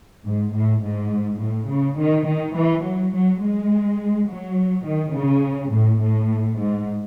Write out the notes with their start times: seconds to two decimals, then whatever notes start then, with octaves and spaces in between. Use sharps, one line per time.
0.25 G#2
0.54 A2
0.83 G#2
1.40 A2
1.69 C#3
1.98 D#3
2.27 D#3
2.55 E3
2.84 F#3
3.13 F#3
3.42 G#3
4.29 F#3
4.86 D#3
5.14 C#3
5.72 A2
6.01 A2
6.58 G#2